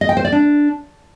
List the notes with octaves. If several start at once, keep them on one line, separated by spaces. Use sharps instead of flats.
D#5
G5
C5
D5
D4